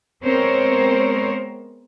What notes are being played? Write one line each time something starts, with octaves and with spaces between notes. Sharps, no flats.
G#3 B3 C4 A#4 C5 C#5